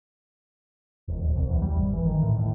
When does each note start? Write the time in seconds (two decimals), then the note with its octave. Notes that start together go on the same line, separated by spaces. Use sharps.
1.08 E1
1.23 D1
1.35 C2
1.50 E2
1.62 G3
1.78 G#1
1.93 E3
2.05 D#3
2.23 A2
2.39 A2